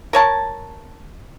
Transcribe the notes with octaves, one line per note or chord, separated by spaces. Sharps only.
A#4 C#5 A5